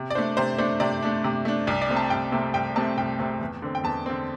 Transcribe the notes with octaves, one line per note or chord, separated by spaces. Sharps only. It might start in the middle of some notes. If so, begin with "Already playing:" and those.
Already playing: C3
D5
A3 D4 C5
C3 C5
A3 D4 C5
C3 D5
A3 D4
C3
A3 D4
C2 D5
D5
C3 A3 C4
A5
C2 G5
C3 A3 C4 E5
C2 G5
C3 A3 C4 A5
C2 G5
C3 A3 C4
E2
D3 C4
G5
E2 A5
D3 C4